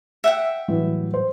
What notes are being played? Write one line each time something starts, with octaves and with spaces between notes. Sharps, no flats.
E5 F#5 G5
A2 E3 F#3 G3
C5